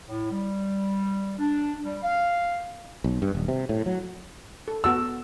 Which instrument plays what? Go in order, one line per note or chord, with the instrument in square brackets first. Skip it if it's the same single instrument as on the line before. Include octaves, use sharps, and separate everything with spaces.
[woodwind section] A2
G3
D4
G3
F5
[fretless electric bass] B1
G2
D#1
C3
A2
F#3
[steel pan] A4
[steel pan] B3 F#4 A5 [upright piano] E6